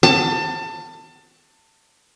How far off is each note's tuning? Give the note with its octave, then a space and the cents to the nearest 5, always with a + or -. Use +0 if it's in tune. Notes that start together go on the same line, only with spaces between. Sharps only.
A5 +25